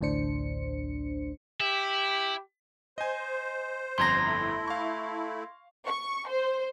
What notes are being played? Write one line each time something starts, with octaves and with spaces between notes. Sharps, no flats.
A1 D2 A2 D4 C5 C#7
E4 G4
C5 D#5 G#5
G1 F2 A#5 C6 G#6 A#6
A3 E4
F5 C#6
C#6
C5